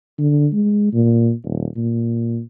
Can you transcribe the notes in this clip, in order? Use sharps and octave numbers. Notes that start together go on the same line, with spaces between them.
D3
G#3
A#2
D#1
A#2